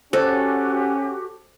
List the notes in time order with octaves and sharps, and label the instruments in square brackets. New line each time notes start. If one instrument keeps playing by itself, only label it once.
[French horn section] C#4 [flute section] F#4 G4 [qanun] A4 [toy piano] C5 D5